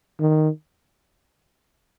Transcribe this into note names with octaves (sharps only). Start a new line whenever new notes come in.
D#3